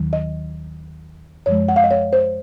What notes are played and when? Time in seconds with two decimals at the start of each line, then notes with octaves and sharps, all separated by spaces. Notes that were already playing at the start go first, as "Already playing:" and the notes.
Already playing: D#2 D#3 F#3
0.13 D#5
1.46 F#2 F3 G#3 C#5
1.68 F#5
1.76 F5
1.84 D#5
1.91 C#5
2.13 C5